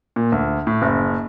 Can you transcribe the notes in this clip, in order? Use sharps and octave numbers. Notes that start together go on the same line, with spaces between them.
A#2
D2
A2
F#1